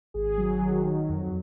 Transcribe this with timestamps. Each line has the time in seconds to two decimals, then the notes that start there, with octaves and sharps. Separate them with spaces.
0.14 G#1 G#4
0.38 F#3
0.61 D#3
0.85 F#3
1.09 F2